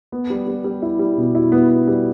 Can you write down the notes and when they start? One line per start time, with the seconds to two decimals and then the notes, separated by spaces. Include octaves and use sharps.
0.12 B3
0.30 G3
0.47 G3
0.64 G3
0.82 E4
0.99 G3
1.17 B2
1.35 E4
1.52 B3
1.69 B3
1.88 G3